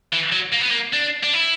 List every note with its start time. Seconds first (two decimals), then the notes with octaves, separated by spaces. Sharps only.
0.13 E3
0.33 F#3
0.53 A#3
0.62 B3
0.71 A#3
0.93 D4
1.24 D4
1.34 E4